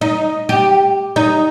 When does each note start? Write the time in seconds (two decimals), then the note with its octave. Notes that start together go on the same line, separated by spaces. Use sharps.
0.01 D#4
0.49 G4
1.16 D#4